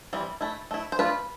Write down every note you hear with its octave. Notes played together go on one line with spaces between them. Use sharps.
E3 G3 C4
A3 E4
A3 E4
C5
A3 D4 F4 B4